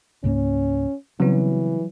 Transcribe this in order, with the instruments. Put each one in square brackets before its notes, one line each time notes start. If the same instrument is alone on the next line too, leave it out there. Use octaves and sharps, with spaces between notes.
[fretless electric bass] C#2 G#2 A#3 [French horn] C#4
[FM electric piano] C#3 B3 [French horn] E3 [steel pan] F#3 G3 [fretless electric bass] C4